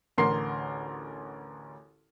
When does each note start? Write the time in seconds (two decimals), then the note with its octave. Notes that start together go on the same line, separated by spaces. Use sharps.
0.18 A1 D2 A#4 C6 C7